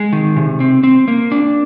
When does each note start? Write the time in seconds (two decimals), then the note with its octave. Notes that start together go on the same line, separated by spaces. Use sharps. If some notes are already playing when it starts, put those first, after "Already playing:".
Already playing: G#3
0.13 D#3
0.36 C3
0.60 C4
0.84 C4
1.08 A#3
1.32 D4